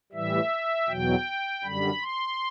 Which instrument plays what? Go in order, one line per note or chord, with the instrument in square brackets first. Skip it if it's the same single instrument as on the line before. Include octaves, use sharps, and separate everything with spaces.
[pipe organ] A2 E3 G3 E5
E2 B2 F#3 G5
F#2 D3 G3 B5
C6